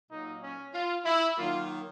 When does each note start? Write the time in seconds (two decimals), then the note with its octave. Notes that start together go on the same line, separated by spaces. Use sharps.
0.10 A#2 F#3 A#3 D#4
0.42 C#4
0.74 F4
1.05 E4
1.37 D#3 F#3 A#3 F4